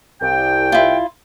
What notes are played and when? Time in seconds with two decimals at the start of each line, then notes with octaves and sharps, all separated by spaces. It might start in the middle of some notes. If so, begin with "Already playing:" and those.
0.21 C2 G5
0.72 E4 F4